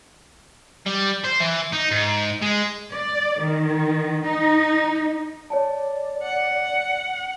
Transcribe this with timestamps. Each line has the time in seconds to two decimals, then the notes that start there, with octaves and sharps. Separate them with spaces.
0.86 G3
1.25 C5
1.40 E3
1.73 D#4
1.91 G#2
2.42 G#3
2.93 D5
3.41 D#3
4.25 D#4
5.50 C#5 D5 G#5 A5
6.23 F#5